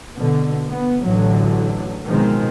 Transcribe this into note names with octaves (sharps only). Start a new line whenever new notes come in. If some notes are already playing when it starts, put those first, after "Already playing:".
B2 D3
B3
A1 A2 D3 F#3
B2 D#3 F3 G#3 C4